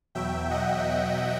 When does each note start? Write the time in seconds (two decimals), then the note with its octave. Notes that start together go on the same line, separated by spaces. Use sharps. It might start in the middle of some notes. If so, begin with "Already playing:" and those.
0.15 E2 B2 F#3 E5 G5
0.51 D#5 F#5